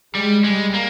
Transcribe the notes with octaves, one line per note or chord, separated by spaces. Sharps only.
G3 G#3
G3 G#3
A#3